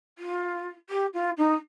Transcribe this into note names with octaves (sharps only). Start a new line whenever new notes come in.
F4
G4
F4
D#4